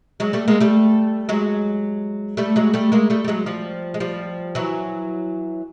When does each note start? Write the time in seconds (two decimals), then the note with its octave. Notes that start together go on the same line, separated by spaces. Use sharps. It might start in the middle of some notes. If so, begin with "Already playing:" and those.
0.20 F#3 G#3
0.33 G3 A3
0.48 G#3 A#3
0.60 G3 A3
1.29 F#3 G#3
2.37 G3 A3
2.56 F#3 G#3
2.74 G3 A3
2.92 G#3 A#3
3.10 G3 A3
3.25 G3
3.28 F#3 G#3
3.46 F3 G3
3.94 G#3
4.00 F3 G3
4.55 E3 F#3